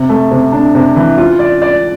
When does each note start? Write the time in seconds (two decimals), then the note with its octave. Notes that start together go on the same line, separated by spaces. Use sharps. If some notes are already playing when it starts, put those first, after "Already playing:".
Already playing: C3
0.09 A3
0.31 C3
0.52 D4
0.75 C3
0.96 E3
1.18 F4
1.39 D5
1.62 D5